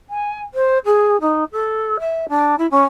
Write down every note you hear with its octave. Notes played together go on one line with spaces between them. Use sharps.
G#5
C5
G#4
D#4
A4
E5
D4
E4
C#4